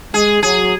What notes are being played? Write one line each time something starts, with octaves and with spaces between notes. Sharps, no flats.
G#3 G#4
F#3 G#4